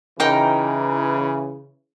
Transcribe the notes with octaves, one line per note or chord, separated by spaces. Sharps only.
C#3 E3 D#4 A#4 G5